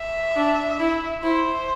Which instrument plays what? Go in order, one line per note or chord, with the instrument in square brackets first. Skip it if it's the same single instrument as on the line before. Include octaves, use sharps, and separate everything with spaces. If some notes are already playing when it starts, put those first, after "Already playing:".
Already playing: [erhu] E5
[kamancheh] D4
E4
[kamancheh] E4 [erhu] C5